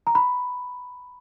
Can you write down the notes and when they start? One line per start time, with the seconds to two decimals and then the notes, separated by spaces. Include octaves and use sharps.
0.07 A#5
0.15 B5